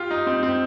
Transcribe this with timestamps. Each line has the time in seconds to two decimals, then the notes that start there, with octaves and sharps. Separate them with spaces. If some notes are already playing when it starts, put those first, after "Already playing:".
Already playing: F4 G4
0.11 D#4
0.27 C4
0.43 C4